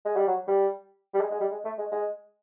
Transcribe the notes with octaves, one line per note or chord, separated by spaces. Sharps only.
G#3
G3
F#3
G3
G3
G#3
G#3
G3
G#3
A3
G#3
G#3